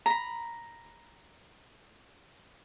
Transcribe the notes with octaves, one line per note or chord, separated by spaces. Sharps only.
A#5 B5